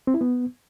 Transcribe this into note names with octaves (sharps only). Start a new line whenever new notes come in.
C4
E4
B3